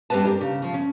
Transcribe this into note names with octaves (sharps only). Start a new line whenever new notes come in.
G2 G3 C4 C#4 B4 A5
D4 G4 A4 A#4
C#3
C#3 F3
C#4